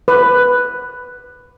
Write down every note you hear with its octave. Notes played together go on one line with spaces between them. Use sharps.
B4